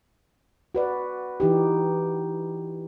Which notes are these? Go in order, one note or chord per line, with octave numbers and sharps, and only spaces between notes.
F#4 B4 D5
E3 D#4 G4